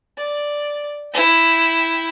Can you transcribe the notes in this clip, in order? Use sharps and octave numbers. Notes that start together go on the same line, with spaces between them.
D5
E4 G5